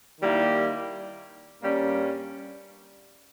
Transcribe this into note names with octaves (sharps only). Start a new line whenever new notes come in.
D#3 G3 A#3 E4 G4
G2 G3 A#3 C#4